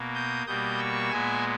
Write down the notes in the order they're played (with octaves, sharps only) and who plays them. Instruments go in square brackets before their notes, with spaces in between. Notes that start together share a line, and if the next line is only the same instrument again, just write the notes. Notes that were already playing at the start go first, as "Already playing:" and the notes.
Already playing: [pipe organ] B2 A#3
D#6 G6
B2 G3 A#3 D#6 G6
C#6 E6
A#2 G#3 B3 E5 G#5